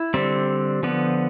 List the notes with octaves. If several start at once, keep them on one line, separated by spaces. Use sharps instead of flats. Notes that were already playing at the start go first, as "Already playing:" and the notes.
Already playing: E4
D3 G3 C4
D3 F3 B3